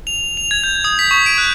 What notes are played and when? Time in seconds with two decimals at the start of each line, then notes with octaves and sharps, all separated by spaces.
0.07 F7
0.37 F7
0.51 G#6
0.64 G6
0.84 D#6
0.99 B6
1.11 C#6
1.26 D7
1.38 F#6